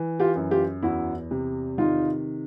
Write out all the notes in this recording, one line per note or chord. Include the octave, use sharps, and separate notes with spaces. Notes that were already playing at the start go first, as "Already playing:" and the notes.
Already playing: E3
F4 G4
F#2
F4 G4
E2 E4 F#4
C3
D#3 D#4 F4